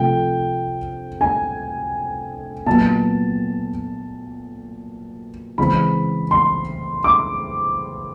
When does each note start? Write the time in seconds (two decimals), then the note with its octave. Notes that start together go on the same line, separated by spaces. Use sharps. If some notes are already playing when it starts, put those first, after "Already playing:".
Already playing: C3 F3 A3 G5
1.21 G#5
2.66 A#2 F#3 B3 A5
5.58 C#3 E3 G#3 C4 B5
6.31 C6
7.04 D6